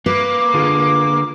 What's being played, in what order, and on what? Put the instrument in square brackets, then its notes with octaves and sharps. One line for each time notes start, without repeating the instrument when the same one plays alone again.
[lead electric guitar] A#3 [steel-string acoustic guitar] B4 [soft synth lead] D6
[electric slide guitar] D3 F4 G#4